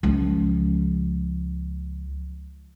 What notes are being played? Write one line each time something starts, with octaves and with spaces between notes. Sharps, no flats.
C#2 F3